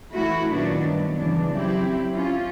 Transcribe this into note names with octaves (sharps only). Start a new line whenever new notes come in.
E3 A3 E4 F#4
A#2 D#3 F#3 B3 D4
G2 F#3
C#3 E3 D4
F#3 C4 E4 G4
C#4 F4